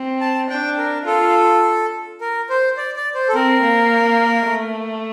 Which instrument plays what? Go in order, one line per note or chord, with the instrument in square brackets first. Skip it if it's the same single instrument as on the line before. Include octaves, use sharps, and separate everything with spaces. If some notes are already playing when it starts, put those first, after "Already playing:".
Already playing: [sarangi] C4
[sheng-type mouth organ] A5
[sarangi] D4 [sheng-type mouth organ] G5
[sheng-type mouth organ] A#4
[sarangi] F4 [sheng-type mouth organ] A4
[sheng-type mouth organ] A#4
C5
D5
D5
C5
A4
[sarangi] C4 [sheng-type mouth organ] A#4
[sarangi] A#3
A3